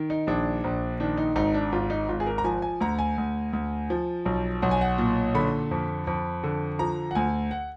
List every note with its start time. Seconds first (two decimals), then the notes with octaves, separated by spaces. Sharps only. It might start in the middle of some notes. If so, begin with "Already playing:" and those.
Already playing: D#3
0.10 D#4
0.27 A#1 D4
0.64 A#1
1.00 D#3 D4
1.17 D#4
1.36 G#1 D#4
1.54 D4
1.72 G#1 F4
1.90 D#4
2.09 G#1 F4
2.20 G#4
2.26 A#4
2.38 A#5
2.44 F3 G#5
2.62 G#5
2.81 D2 A#5
2.99 G#5
3.18 D2
3.53 D2
3.90 F3
4.26 B1
4.62 B1 F#5
4.71 G#5
4.81 F#5
4.98 A#2
5.35 D3 B5
5.71 F2
6.07 F2
6.44 D3
6.79 F3 A#5
7.11 F#5
7.15 D2 G#5
7.51 F#5